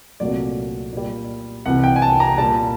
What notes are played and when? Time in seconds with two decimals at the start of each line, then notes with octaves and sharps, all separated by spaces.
0.20 C2 A#2 F#3 A3 D5
0.93 A#2 G3
1.66 C2 C3 E3 F#5
1.84 G5
1.96 G#5
2.02 A5
2.20 A#5
2.38 A#2 G3 A5